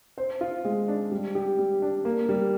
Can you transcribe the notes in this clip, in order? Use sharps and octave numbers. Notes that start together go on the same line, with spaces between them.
C5
F4
G#3
D4
G3
G4
G3
D4
A#3
G3